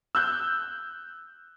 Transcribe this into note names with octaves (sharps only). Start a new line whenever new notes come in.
E6 F#6 G6